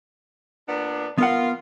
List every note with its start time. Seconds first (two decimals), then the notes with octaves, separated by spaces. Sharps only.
0.67 A#2 B3 D4
1.18 B3 F4 A#4 F#5